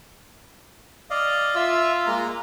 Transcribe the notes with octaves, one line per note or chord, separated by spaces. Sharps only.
D5 D#5 F5
F4 E5 E6
G#3 A#3 A#5